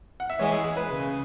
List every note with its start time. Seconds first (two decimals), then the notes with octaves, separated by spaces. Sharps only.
0.20 F#5
0.30 E5
0.39 E3 G#3 C#5
0.51 G#4
0.64 G#4
0.77 B4
0.89 C#3